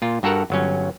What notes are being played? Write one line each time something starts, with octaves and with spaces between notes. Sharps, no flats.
A#2 F4
G2 F#4 A4 A#4 F#5 A#5
G1 F#3 C#4